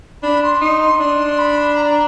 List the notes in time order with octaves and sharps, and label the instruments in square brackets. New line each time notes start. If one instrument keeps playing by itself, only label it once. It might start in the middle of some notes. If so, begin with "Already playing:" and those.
[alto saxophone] D4 [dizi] B5
[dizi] C6
[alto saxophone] D#4 [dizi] C6
[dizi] C6
[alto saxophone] D4 [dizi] C6
[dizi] B5
A#5